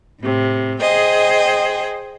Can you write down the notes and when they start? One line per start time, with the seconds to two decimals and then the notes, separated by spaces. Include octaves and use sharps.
0.21 A2 C3
0.80 G#4 C5 D#5 G5